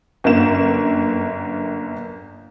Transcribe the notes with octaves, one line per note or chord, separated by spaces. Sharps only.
G1 F#2 A#3 E7